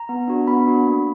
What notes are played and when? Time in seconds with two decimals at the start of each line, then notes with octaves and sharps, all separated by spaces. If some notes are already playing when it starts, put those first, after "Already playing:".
Already playing: A#5
0.09 B3
0.28 D4 F#4
0.47 B3 B5
0.67 D4 F#4
0.87 A#3